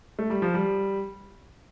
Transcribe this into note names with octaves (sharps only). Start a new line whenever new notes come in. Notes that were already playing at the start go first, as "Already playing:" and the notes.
A3
G3
F3
G3